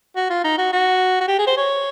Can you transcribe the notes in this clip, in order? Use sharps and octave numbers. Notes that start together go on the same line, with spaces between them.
F#4
F4
D#4
F#4
F#4
F#4
G4
G#4
C5
C#5